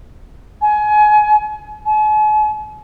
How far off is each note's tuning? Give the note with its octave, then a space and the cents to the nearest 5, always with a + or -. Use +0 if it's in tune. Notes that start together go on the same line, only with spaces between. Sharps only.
G#5 +25
G#5 +45